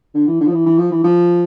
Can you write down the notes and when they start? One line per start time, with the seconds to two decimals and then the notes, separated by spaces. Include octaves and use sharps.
0.15 D3
0.28 E3
0.40 D3
0.46 F3
0.53 E3
0.66 E3
0.78 F3
0.91 E3
1.04 F3